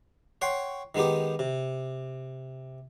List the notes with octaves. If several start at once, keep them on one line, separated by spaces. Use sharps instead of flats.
C#5 F#5 G5 C6
D#3 G#3 B3 D#4 G4
C3